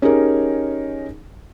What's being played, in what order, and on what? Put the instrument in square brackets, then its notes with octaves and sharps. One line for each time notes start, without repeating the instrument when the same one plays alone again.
[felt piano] C#4 D#4 G4 G#4 A#4